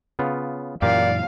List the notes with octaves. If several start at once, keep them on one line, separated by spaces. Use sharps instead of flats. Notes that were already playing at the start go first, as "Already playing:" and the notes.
C#3 B3 F4
F#2 A#2 E3 F4 G4 A#4 D5 F5